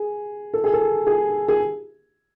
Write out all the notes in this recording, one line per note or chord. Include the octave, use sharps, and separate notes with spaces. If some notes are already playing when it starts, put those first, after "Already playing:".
Already playing: G#4
A4
G#4
A4
G#4
G#4